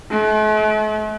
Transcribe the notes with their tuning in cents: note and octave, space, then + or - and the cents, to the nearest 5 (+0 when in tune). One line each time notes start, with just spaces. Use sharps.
A3 -45